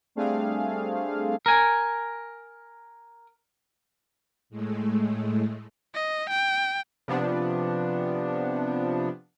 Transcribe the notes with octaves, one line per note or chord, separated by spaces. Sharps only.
G3 A3 C4 D4 G#4 F5
A#4 G#5
A2 G#3 A3
D#5
G5
C3 F3 B3 D4